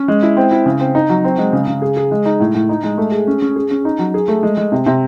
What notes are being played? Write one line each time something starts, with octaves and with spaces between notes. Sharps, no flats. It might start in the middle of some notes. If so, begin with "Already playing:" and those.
Already playing: C#4
G#3
E4
C4
E4
C#3
C4
D#4
F#3
C4
G#3
C#3
C#3
G#4
G#4
G#3
D#4
A2
A2
D#4
G#3
A3
G#4
C#4
C#4
G#4
C#4
D#4
F#3
G#4
A3
G#3
G#3
C3
C3